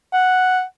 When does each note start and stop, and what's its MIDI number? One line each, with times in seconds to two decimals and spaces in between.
0.13 0.63 78